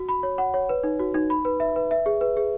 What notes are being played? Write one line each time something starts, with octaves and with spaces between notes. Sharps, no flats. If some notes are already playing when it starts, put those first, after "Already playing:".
Already playing: F#4
B5
C#5
F#5
C#5
B4
D#4
F#4
D#4
B5
B4
E5
B4
E5
G#4
B4
G#4